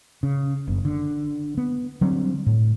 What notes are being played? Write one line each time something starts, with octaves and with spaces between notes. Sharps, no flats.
C#3
F#1
D3
B3
D3 F#3 G3 C4
A2